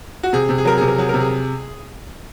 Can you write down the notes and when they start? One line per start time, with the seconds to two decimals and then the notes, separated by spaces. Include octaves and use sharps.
0.23 F#4
0.33 C3 G#4
0.49 C3
0.58 G#4
0.65 F#3 A#4
0.78 C3 G#4
0.88 A#4
0.98 F#3 G#4
1.09 C3 A#4
1.20 G#4